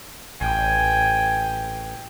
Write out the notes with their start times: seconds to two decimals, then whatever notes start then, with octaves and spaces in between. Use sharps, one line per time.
0.41 A1 G5 G#5